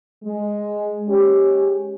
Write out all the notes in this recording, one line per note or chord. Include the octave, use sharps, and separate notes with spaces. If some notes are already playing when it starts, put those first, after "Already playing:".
G#3
G#3 C#4 G4